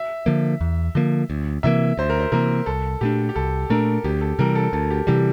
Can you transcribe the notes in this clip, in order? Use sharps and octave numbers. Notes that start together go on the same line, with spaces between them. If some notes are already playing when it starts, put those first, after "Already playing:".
Already playing: E5
D3 F3 A#3
E2
D3 F3 A#3
D2
C3 E3 A#3 E5
D2 C5
A#4
C5
C3 E3 A#3 A#4
C2 A4
A#2 A3 D4 G4
G4
C2 A4
A#2 A3 D4 A#4
D2 G4
A4
C3 E3 G3 A#4
A4
D2 A4
G4
C3 E3 G3 G4